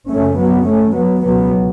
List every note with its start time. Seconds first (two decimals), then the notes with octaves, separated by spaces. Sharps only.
0.11 F#2 C#3 A3 C#4
0.40 F#3 B3
0.68 A3 C#4
0.96 F#3 B3
1.25 C#2 B2 F#3 B3